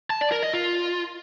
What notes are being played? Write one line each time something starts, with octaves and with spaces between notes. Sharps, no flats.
A5
D5
A#4
D#5
F4